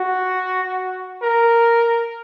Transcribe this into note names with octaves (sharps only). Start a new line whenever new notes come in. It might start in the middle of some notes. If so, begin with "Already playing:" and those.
Already playing: F#4
A#4